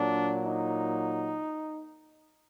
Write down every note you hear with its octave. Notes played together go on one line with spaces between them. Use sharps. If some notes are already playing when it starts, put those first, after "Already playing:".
Already playing: A#2 F#3 D4
D#4